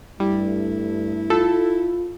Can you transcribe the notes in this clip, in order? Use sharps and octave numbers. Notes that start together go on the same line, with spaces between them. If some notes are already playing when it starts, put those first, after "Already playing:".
G2 G3 A3 E4
F4 A4